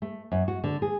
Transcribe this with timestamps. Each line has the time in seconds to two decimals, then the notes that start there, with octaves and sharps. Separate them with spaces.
0.02 A3
0.32 F#2
0.48 F#4
0.64 D3
0.82 G#4